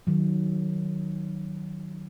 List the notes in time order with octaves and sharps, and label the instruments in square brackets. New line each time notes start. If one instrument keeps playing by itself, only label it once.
[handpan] D#3 F#3